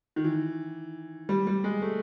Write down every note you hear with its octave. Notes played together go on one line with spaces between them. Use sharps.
D#3
E3
G3
G3
G#3
A3